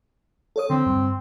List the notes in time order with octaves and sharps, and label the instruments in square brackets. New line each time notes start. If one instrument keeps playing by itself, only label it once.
[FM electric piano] A4 C#5 D#6
[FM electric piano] D3 [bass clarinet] C4
[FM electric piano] G2